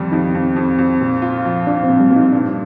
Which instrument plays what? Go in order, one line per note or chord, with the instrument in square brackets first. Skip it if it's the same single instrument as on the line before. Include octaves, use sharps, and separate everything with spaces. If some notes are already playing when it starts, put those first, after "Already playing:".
Already playing: [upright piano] F2 G3 [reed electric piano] D#3 F3
[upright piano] F2 [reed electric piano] D#4
[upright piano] F2
F2
F2
A#2
F4
F3
[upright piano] F3 [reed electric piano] D4
[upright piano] A#2 [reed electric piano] C4
[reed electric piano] G3
[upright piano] A#2
[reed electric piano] D#4
[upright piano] G2 [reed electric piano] D4